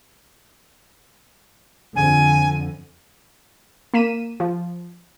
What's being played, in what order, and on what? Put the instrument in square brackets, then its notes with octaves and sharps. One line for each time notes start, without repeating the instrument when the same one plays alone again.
[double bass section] F2 D3 [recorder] G#5
[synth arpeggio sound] A#3 B6 D#7 E7
F3